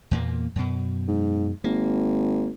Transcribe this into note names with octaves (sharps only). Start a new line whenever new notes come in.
E2 A#2 A#3
F#2 B2
G#2
G#1 A#3